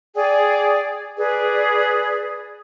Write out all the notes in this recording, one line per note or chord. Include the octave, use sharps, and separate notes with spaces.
G#4 D5 G5 G#5
G#4 B4 D5